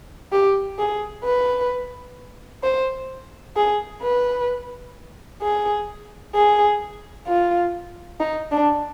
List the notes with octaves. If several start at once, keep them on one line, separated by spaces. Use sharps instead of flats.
G4
G#4
B4
C5
G#4
B4
G#4
G#4
F4
D#4
D4